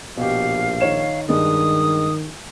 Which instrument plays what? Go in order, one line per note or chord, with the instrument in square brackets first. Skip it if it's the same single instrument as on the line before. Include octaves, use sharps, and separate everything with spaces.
[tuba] A#1 [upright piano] B2 G4 [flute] F5
[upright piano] D#3 C#5 E7
[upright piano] G2 G#3 [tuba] D#3 [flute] D#6